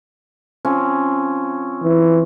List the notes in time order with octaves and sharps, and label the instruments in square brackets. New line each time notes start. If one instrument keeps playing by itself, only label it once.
[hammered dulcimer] F3 C4 C#4
[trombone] E3